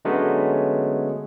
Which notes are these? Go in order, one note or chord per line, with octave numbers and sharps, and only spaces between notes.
D3 F#3 G#3 A3 B3 C#4